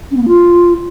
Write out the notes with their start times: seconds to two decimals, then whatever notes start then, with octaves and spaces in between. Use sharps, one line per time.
0.11 C#4
0.17 B3
0.22 A#3
0.28 F4